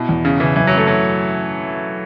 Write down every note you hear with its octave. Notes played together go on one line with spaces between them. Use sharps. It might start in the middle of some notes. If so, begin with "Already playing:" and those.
Already playing: B2 E4
E2
C#3 C#4
C#3 E3
F#2 E3
F#3
F#2
A3
F#3 E4